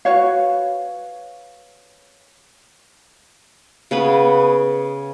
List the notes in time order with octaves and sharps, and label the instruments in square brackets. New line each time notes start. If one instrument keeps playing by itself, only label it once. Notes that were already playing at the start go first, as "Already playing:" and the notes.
[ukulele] F#4 B4 C#5 F5
[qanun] C#3 B3 B4